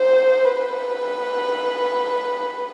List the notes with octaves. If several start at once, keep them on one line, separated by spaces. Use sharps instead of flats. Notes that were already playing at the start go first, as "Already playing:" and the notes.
Already playing: C5
B4